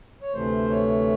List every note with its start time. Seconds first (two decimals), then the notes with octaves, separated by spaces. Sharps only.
0.22 C#5
0.33 D2 C3 E3 A3 C5
0.70 C#5